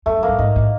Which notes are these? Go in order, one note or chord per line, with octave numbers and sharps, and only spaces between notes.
F#2 A3
F#2
A#3
G2
G#2 D#4
A2